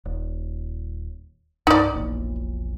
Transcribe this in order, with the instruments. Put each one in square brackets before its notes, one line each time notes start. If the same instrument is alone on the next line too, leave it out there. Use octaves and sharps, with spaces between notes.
[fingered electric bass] D#1
[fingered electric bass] C2 G2 D4 [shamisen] D#4 D5
[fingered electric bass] E1 A#1 A#2